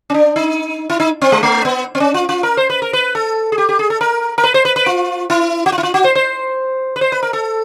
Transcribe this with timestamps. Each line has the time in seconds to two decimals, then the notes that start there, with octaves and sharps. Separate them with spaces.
0.10 C#4
0.14 D4
0.36 D#4
0.90 E4
1.00 D#4
1.22 C4
1.32 G#3
1.43 A3
1.65 B3
1.95 C4
2.00 C#4
2.14 F4
2.29 F4
2.43 A#4
2.57 C5
2.70 B4
2.82 A#4
2.93 B4
3.15 A4
3.52 G#4
3.58 G4
3.69 G4
3.79 G#4
3.90 A4
4.01 A#4
4.38 A#4
4.43 B4
4.54 C5
4.65 B4
4.76 B4
4.86 F4
5.30 E4
5.66 F#4
5.72 F4
5.78 E4
5.83 F4
5.94 F#4
6.04 C5
6.15 C5
6.96 B4
7.01 C5
7.12 B4
7.22 A#4
7.33 A4